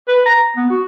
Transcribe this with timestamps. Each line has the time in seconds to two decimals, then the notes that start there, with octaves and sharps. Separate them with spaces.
0.08 B4
0.25 A#5
0.57 B3
0.70 F#4